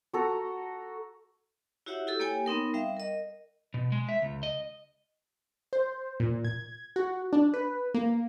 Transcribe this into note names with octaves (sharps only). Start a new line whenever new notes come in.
F#4 A4 A#5
E4 F#4 G4 C#5 E5 F#5
E4 G4 A4
A#3 G4 C#5 G5 G#5
B3 C4 D#4 A#4
G3 E5 F5 G5
A#4 D#5
B2
G#3
E5
C#2
D#5
C5
A#2
G#6
F#4
D4
B4
A#3